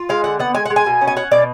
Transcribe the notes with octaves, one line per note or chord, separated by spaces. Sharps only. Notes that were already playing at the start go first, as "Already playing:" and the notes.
Already playing: F4
G#3 F5
D3 F#5
B3 F#5
G#3 G#5
F#5
G#3
G#5
B2
C#4
G#5
C#4 F#5
B2 D5